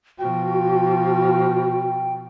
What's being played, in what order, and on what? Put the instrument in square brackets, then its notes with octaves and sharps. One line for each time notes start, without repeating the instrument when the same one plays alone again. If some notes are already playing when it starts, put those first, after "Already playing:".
[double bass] B2 F3 [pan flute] F#4 [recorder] G5